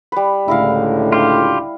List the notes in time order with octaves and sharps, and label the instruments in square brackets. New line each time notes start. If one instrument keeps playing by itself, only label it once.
[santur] G3 B4
[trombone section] C#2 A2 D3 [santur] E4 A#4 F5
[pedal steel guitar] F4 G4